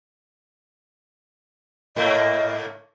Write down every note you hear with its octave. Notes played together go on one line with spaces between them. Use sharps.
G#2 A3 A#3 D#5